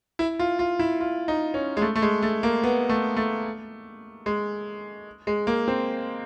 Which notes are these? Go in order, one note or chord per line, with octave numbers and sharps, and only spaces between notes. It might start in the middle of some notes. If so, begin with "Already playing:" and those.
E4
F4
F4
E4
F4
D#4
C#4
G#3
A3
A3
G#3
A3
A#3
B3
A3
A3
G#3
G#3
A#3
C4